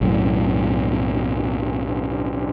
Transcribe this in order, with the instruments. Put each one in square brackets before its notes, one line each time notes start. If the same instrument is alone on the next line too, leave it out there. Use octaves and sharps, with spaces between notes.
[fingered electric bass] B1 F#2 A2